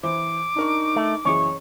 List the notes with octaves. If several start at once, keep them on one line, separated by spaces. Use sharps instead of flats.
E3 C5 D6
D4 D#4 A#4 C#6
A3
F#1 E3 G#4 C#5